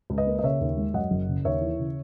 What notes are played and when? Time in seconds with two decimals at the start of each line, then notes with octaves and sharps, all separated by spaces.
0.10 C#2
0.18 B4 D#5
0.26 A#3
0.39 D#5
0.43 C#3 C#5 E5
0.61 D#2
0.77 G#3
0.94 F#2 D#5 F#5
1.11 F#1
1.28 C#3
1.45 D#2 C#5 E5
1.61 E3
1.79 C#3